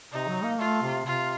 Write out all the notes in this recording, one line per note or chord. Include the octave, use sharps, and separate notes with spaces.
C3 D#4
F#3
A#3
A3 F4
C3
C3 F4